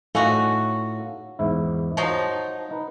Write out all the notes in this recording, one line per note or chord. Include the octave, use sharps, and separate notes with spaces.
A2 C#4 D#4 F4 F#4 A4
E2 G#2 E4
F3 F#3 D#4 A5
D#4 B4